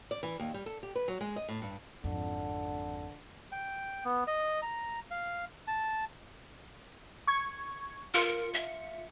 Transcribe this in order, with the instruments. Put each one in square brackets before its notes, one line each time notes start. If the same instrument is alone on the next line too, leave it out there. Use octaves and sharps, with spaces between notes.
[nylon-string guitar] D5
E3
D#2
G3
A4
G4
B4
F#3
G#3
D#5
A2
G2
[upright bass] G#1 F2 [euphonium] D3
[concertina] G5
B3
D#5
A#5
F5
A5
[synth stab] C#6 G#6
[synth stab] F4 C#7 [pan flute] A#4
[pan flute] E5